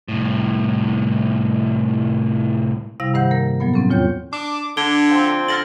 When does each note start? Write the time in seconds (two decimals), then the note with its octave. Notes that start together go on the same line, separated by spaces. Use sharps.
0.08 C2 A2
3.00 C3 G3 E4 F5 A#6
3.14 G2 D#3 C5 F#5 G6
3.31 A#3 A#4
3.60 A2 F3 F#3 A#3 B3
3.74 C4 C#4 A4
3.89 E2 A#2 F4 C#5 G5 G6
4.33 D4 D6
4.77 D3 D4 G#6 D7 G7
5.09 F3 C4
5.48 D3 F6 A6 A#6 F#7